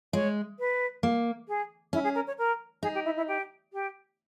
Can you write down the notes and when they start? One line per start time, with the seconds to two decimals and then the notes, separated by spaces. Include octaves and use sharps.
0.13 G#3 C#5
0.59 B4
1.03 A#3
1.48 G#4
1.93 C#4 E4
2.03 G#4
2.14 A#4
2.27 C#5
2.38 A#4
2.82 D#4 G#4
2.94 G4
3.05 E4
3.16 E4
3.27 G4
3.73 G4